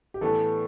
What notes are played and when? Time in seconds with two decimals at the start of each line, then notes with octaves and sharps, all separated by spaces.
0.14 G4
0.21 A2 E3 B3 D4 A4